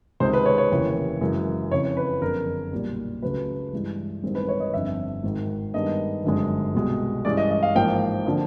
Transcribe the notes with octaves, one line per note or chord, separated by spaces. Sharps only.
C#2 C3 D#3 G#3 C4 C5
B4
C#5
C#5
F1 D#2 C#3 E3
F#2 C#3 E3 G#3
F2 C#3 E3 C#5
B4
F#1 F2 D3 A#4
B1 A#2 G3
C#2 C#3 F#3 A3 B4
G2 E3 G#3
A1 G2 D#3 G#3 C4
B4
C#5
D#5
G1 F2 D3 E5
G#1 G#2 D#3
G2 D#3 G#3 B3 D4 D#5
G1 F#2 D3 F3 G#3
C2 B2 G#3
G2 E3 G#3 C#4 D5
D#5
D#5
F5
A1 G#2 F3 A#3 G5
D3 F3 A#3